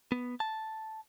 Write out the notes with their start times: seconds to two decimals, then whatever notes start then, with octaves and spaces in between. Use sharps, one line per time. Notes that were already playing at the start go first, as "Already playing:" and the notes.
0.12 B3
0.40 A5